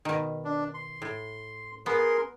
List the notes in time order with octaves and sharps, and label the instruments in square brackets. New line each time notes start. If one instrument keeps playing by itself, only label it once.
[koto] B2 D#3
[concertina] D4
C6
[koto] A2
[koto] B3 [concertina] G#4 A#4 C6